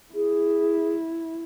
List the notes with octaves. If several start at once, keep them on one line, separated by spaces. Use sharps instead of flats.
E4 G#4